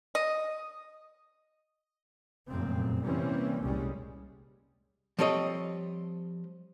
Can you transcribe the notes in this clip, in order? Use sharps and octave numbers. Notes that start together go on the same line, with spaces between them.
D#5
F1 F#2 A#2 C#3 C4
C3 E3 G3 A#3 C4 C#4
F1 C2 A#2 G3 G#3 C#4
F3 G3 C4 A4 C#5 D#5